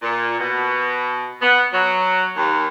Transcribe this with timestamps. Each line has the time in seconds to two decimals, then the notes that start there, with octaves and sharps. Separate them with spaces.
0.02 A#2
0.38 B2
1.40 B3
1.73 F#3
2.36 D#2